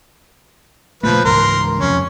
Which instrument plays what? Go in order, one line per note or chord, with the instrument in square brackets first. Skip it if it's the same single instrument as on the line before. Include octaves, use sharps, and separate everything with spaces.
[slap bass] A#2 C#3 A3 [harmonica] F3 B4
[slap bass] C#2 G#2 E3 [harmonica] A#4 C6
[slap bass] F2 C3 [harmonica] C#4